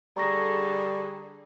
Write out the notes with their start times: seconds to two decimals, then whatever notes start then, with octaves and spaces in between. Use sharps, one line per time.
0.17 D3 G3 G#4 A4 A#5 C#6 A#6